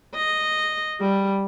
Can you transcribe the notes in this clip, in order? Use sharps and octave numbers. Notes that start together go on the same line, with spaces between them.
D#5
G3